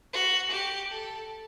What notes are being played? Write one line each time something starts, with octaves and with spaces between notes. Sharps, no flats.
F#4
G4
A4